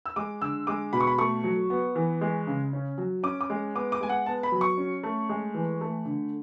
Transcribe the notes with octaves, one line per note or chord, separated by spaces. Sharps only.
E6
G#3 D6
D3 E6
G#3 D6
B2 B5
C#6
B5
A3 C#6
F#3
B3
E3
G#3
C#3
C#4
F#3
C#4 D6
D6
G#3
B3 D6
D6
G#3 G#5
F#5
B3 A5
B5
F#3
C#6
C#4
A3
G#3
E3
A3
D3